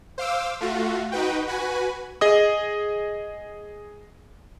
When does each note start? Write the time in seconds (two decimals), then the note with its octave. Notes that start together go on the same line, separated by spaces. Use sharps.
0.18 C5 F5 D6 E6
0.61 A3 F4 F#4
1.12 D#4 F#4 B4 G5
1.48 F#4 B4 G#5
2.21 G#4 D#5 D#6